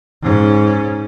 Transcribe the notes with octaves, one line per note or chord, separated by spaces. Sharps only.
G#2 C#4